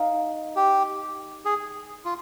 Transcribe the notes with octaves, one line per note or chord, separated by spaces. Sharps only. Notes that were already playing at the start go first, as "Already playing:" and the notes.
Already playing: D#4 A#4 F5
G4
G#4
F4